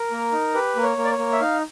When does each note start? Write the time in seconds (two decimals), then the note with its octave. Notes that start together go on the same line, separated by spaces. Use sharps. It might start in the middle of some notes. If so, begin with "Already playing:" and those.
Already playing: A#4
0.11 A#3
0.32 D#4
0.54 G4 B4
0.76 A#3
0.83 C#5
0.97 A#3
1.05 D5
1.11 C#5
1.18 A#3
1.32 E5
1.40 D#4 F5